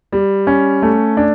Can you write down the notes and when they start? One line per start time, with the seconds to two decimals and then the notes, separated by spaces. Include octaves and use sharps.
0.12 G3
0.47 C#4
0.82 A3
1.17 D4